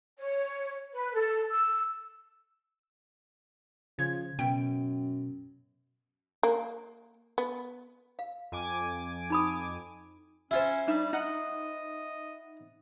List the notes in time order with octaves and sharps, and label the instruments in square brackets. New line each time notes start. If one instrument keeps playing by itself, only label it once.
[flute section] C#5
B4
A4
E6
[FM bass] C#3 [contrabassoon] F3 [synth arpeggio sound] G#6
[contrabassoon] F#2 [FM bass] B2 [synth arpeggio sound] G5
[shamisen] A#3
B3
[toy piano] F5
[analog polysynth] F2 G#5 D6
[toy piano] D#4 B5 D#6
[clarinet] C#4 [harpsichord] E4 F4 C5
[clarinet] G3 [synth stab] D4 D#4 E5
[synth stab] D#4 F#5 [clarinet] D#5